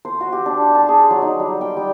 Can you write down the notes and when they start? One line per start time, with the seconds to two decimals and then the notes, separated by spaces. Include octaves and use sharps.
0.05 C5
0.21 F#4
0.33 G4
0.46 D4
0.61 G4
0.75 A5
0.89 G#4
1.11 F#3
1.22 D#4
1.39 G3
1.61 G5
1.77 G3